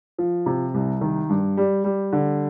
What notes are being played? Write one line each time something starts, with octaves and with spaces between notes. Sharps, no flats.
F3
C3
C2
D#3
G2
G3
G3
D3